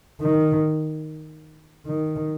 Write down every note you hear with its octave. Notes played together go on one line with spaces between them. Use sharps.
D#3
D#3